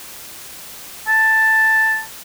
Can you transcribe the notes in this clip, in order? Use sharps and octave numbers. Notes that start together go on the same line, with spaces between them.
A5